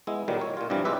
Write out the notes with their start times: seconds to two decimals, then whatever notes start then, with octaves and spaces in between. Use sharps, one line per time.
0.07 G#3 B3 E4
0.28 A#2 D#3 F#3 G3
0.41 C#5
0.57 A#2 F4
0.70 G2 C3 E3 F3 G3
0.85 G#3 F4 G4 B4 E5